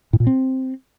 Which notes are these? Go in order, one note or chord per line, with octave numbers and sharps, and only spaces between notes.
A2
A#2
C4